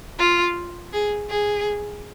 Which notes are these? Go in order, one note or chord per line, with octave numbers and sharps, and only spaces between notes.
F4
G#4
G#4